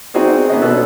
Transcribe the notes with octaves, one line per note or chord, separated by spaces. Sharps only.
C4 D#4 F#4 G#4 C5 D5
A#3 B3 C#4 D#5
B2 D4 A4 B4